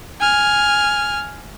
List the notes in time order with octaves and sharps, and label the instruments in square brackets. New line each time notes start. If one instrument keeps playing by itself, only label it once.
[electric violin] G#5 F6